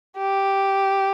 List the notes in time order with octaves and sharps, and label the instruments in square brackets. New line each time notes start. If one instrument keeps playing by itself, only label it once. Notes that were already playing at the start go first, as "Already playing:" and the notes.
[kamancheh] G4